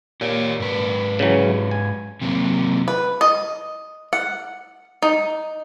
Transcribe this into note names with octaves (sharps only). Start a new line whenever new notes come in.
A#2 G4 C#5
G#2 B4
C#3 E3 F#3
G#5
C3 F#3 A#3
B4
D#5
F#5
D#4